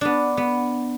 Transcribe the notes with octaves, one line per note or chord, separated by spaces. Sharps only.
B3 D4
B3